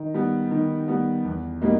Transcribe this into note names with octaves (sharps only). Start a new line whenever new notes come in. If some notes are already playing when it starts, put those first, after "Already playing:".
Already playing: D#3
G3 B3
D#3
G3 B3
E2
B2 G3 A#3 D#4